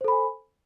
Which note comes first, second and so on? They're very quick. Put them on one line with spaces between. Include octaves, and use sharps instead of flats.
C5 A4 B5 G#5